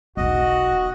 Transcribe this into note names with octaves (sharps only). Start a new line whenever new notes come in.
E1 B1 F#4 D#5